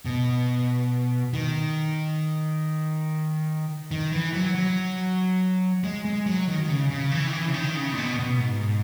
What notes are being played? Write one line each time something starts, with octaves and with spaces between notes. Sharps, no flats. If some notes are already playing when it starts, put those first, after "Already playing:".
B2
D#3
D#3
E3
F#3
F#3
G#3
G#3
F#3
D#3
D#3
C#3
C#3
E3
D#3
E3
C#3
D#3
C#3
A#2
B2
B2
G#2